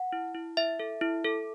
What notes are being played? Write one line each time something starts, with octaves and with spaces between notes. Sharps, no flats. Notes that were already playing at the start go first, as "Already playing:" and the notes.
Already playing: F#5
E4
E4
E4 E5
A4
E4
A4